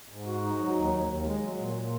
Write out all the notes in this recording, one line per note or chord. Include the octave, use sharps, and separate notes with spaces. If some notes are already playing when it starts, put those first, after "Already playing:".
G#2
F#4
D#4
F#3
D#2
D#2
D#2
G#3
F#3
A#2
A#2